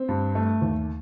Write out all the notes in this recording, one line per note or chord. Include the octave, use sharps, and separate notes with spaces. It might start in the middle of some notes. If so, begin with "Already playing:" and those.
Already playing: C4
G2
A3
D#2